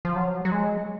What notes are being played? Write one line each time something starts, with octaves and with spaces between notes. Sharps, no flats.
F3
F#3
F#3
G#3